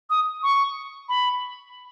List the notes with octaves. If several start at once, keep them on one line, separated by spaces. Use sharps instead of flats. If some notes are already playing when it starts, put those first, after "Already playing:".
D#6
C#6
B5